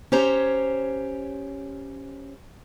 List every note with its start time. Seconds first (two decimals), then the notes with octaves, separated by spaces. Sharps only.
0.12 C#4 G4 C5 C#5 A#5